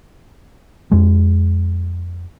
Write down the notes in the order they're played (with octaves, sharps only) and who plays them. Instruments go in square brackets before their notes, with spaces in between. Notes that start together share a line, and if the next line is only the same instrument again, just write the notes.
[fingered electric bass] F2 G#3